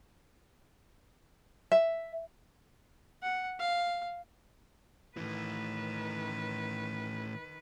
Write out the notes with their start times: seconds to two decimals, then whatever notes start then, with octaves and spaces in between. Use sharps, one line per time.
1.72 E5
3.22 F#5
3.59 F5
5.17 A2 D#3 E3 B4